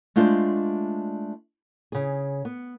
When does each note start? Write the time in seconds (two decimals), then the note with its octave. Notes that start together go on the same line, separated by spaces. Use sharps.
0.16 G#3 A3 D4 F4 C5 D5
1.92 C#3 G#4
2.45 B3